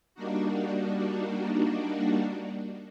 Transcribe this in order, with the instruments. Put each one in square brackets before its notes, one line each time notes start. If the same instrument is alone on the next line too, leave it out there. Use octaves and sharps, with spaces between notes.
[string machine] G3 A#3 D4 D#4 F#4